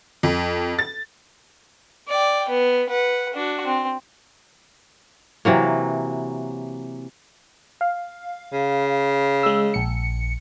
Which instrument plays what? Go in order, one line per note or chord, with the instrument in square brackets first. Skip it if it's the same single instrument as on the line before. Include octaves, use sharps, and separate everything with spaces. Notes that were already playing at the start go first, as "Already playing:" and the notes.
[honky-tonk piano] F2
A6
[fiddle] D5 G5
B3
B4 F#5
D4 F#4
C4
[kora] C3 E3 F#3 A#3
[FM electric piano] F5
[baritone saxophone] C#3
[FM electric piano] G#3 E6
A#1 C#7